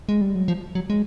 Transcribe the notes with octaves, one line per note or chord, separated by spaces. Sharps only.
G#3
G3
F#3
F3
F#3
G#3